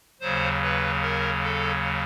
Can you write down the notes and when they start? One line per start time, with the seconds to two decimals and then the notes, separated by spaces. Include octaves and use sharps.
0.21 D#2 C#3 F#3 C5
0.62 B4
1.02 A#4
1.43 A4